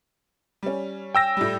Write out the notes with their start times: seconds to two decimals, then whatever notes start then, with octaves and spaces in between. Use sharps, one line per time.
0.63 G3 C#4
1.15 G5 E6 A#6
1.37 A2 G3